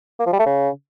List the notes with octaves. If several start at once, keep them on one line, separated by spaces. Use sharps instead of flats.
A#3
F3
G3
A3
C#3